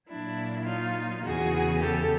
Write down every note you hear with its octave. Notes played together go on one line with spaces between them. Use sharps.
A#2 F#3 D4 E4
D#4 F4
E2 C#3 E3 F#4 G#4
G4 A4